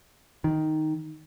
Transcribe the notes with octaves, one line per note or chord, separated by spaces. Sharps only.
D#3